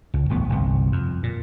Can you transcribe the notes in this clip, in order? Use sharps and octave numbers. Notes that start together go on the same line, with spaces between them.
C#2
D#1 A1 B3
G1 C2
F2
A#2